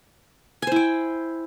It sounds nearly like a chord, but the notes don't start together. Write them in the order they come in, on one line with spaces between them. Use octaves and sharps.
G#5 C5 E4 G5